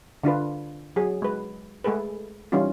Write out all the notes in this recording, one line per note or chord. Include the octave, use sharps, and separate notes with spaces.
D3 D4 F4 B4
F#3 G#4
G#3 B4
G#3 A3 G#4 A4 B4
E3 G3 C#4 D#4 F4